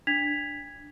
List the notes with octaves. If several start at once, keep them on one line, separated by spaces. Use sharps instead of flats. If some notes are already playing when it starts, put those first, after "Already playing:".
D4 G#6 B6 F7